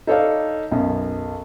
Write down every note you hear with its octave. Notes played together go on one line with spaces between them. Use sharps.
D#4 A4 C#5 D5 F5
B1 F#2